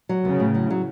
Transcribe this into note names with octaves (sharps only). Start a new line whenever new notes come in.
F#3
C#3 B3
A2
F#3
F#3